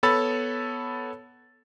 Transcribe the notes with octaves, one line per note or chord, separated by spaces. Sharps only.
B3 A4 C#5 B5 E6 A6